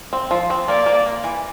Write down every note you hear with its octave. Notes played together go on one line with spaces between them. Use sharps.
C4
F3
C4
A#3 D5
A#3
A#3
E3